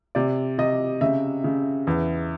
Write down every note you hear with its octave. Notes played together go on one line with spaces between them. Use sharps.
C3 D5
C3 D#5
C#3 E5
C#3
E2